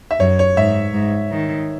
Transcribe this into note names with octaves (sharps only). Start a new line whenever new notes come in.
E5
F#2 C#5
C#5
G#2 E5
G#2
D#3